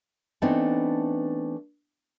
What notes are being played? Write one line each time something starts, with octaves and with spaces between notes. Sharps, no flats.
E3 A3 B3 C4 D4 D#4